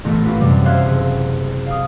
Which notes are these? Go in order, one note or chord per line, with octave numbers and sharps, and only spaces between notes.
A1 A#2 A3 B3 A#4
A#3 C#4 F4 G4 B4
F#2 C3 F#3 G3
C5 E5 F5 F#6 G#6
F#1
F5 D#6